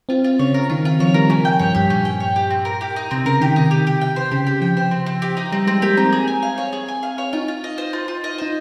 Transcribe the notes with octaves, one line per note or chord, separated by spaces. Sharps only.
C4 F4
F4
C#3 C#5
A#4
D#3 F4
D#3 F4
F3 C#5
G3 A#4
F3 C#4
G5
G2 C#5
G2 G4
A#2 C#4
G5
C#5
G4
C4
A#4
G4
D#4
C3 C4
C#3 A#4
D#3 G4
C3 D#4
G4
G4
G5
C5
C#3 G4
G4
F3 G5
C5
C4
C4
G4
D#4
G3 C4
G#3 C4
A#3 G4
C4 D#4
G#4
G#5
F5
C#5
G#4
G#5
F5
C#5
D#4 F4
F4
D#5
C5
F4
F4
D#5
D#4 C5